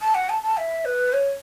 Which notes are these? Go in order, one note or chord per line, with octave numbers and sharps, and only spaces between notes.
A5
F#5
A5
A5
E5
B4
C#5